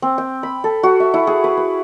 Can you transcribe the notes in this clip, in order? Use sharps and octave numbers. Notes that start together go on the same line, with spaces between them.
C4
G5
B5
A4
F#4
E5
E4
G#4
B4
B4